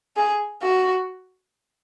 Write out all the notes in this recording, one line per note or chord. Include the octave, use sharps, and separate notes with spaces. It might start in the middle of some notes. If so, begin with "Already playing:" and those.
G#4
F#4